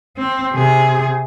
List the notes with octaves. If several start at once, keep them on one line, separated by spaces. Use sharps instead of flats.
C4
C3 G#4